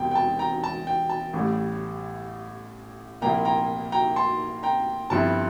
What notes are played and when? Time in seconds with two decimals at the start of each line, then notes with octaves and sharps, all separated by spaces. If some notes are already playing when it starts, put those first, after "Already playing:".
Already playing: E1 E2 C3 G5
0.11 G5
0.15 A5
0.39 G5 A#5
0.64 A5
0.87 G5
1.10 A5
1.33 A1 A2 G3
3.22 C2 A#2 F3 A#3 E4 G5 A#5
3.45 G5 A#5
3.92 G5 A#5
4.16 A5 C6
4.63 G5 A#5
5.10 G1 G2 F3 C4 E4 A5